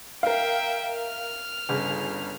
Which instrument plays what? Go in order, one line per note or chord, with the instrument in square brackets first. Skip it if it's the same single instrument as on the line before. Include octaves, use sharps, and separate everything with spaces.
[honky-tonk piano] A#4 F5 [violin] E5 G5
[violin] F6
[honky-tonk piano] G1 C#3 G#4